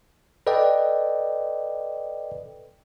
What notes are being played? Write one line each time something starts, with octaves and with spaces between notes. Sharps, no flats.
A4 B4 D5 D#5 G5